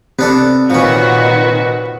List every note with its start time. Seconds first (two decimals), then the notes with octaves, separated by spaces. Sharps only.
0.19 C3 B3 D4 A4
0.70 A#2 D#3 F3 C#4 D#4 F#4 B4